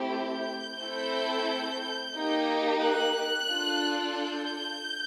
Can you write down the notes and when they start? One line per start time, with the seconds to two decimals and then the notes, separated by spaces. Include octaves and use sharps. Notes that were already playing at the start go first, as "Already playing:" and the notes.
Already playing: A3 C4 E4 G4
0.13 G6
0.80 A3 C4 E4 A4
2.15 A#3 D#4 G4
2.82 F#6
3.50 D4 F4 A4
4.17 G6